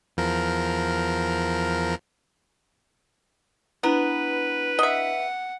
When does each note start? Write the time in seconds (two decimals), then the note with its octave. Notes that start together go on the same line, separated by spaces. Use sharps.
0.17 E2 F3 A#4
3.83 B3 D4 E4 B4 A#5
4.79 D#5 E5 F#5